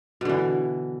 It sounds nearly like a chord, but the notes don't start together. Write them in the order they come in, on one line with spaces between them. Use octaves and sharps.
B2 D3 E3